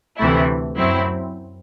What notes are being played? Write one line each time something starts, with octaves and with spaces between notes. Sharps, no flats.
D2 C3 E3 A3 E4
F#2 F#3 C4 E4